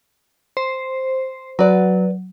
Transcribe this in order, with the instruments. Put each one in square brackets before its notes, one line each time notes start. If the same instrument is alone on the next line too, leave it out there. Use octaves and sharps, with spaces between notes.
[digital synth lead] C5
[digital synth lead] F#3 [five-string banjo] B4 D5